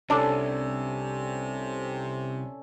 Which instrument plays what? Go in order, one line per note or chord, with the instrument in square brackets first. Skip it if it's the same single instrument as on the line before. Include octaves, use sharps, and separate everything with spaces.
[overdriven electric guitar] C2 [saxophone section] C3 [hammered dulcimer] C#4 A4 D5 [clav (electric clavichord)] D4